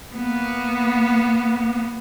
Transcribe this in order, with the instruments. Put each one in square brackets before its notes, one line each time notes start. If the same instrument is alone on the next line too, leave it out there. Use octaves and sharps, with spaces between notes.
[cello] A#3 B3